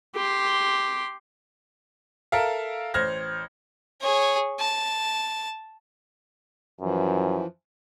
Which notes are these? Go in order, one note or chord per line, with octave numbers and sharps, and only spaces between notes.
G4 C6
A4 A#4 E5 F5
A1 C5 F6 G#6 A#6
G#4 C#5
A5
F#2 E3 F3